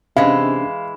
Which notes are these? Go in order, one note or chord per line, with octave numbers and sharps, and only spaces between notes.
C3 E3 G#3 C#4 D4 E4 F5